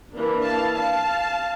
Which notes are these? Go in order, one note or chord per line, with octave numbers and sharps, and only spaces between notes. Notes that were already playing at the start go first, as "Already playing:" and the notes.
E3 A#3 D4
F5 A5
F5 A5